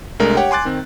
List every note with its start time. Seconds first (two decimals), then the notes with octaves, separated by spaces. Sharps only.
0.19 C2 G#3 A3 D4 A#4
0.37 G4 C#5 F#5 G5
0.51 G#5 C6 D6 F#6 A6
0.65 D#3 C4